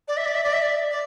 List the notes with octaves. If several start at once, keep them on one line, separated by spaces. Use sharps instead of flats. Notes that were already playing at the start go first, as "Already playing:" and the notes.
D5
E5
D5
E5
D5
E5
D5
D5